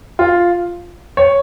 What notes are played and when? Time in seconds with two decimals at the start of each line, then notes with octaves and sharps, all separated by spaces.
0.19 F4
1.17 C#5